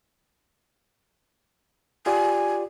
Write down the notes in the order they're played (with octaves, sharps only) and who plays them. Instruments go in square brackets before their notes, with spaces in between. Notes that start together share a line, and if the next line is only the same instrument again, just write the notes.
[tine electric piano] F4 G4 D5 [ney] G#5